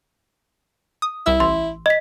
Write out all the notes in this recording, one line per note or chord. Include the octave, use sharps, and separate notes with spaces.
D#6
C2 E4 E6
A1 C6
D#5 B6